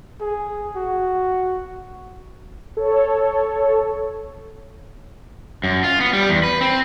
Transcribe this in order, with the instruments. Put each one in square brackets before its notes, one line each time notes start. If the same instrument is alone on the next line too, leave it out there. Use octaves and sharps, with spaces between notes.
[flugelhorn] G#4
F#4
[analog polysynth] A4 C#5
[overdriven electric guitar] F#2
F4
B3
G3
E2
B4
C4